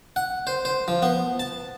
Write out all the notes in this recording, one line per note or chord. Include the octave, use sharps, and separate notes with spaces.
F#5
C5
C5
F3
B3
A5